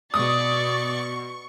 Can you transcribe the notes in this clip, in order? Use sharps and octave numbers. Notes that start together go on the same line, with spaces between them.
B2 D5 C#6 D#6